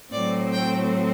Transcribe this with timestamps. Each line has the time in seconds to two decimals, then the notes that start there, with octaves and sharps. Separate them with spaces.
0.12 A2 F#3 C4 D5
0.52 G5